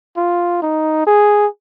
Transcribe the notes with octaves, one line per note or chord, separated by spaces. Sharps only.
F4
D#4
G#4